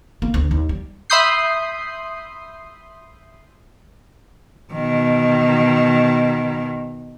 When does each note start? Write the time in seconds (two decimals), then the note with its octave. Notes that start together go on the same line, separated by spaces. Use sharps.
0.22 A#3
0.34 D2
0.51 D#2
0.69 G3
1.10 E5 B5 C6 D#6 G6 C7
4.73 B2 D#3